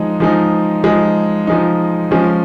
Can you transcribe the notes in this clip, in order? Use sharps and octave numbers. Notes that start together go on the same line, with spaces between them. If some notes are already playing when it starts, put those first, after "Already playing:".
Already playing: F3 G#3 D#4
F3 G#3 D#4
F3 G#3 D#4
F3 G#3 D#4
F3 G#3 C#4